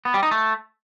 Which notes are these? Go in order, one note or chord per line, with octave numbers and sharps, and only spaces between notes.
B3
G3
D#4
A3